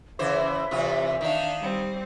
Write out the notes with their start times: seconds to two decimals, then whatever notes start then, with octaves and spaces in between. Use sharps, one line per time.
0.19 C#3 E3 C5 E5
0.71 C3 E3 F4 D5
1.21 D#3 D4 D#4 F5
1.61 G3 C4